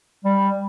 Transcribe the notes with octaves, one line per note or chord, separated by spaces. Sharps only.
G3